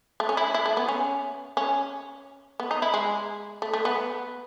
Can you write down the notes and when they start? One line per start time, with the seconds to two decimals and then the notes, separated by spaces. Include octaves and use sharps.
0.20 A3
0.29 C#4
0.37 E4
0.54 E4
0.66 A3
0.77 B3
0.89 C#4
1.57 C#4
2.60 B3
2.71 D#4
2.82 E4
2.94 G#3
3.62 A3
3.73 A3
3.85 B3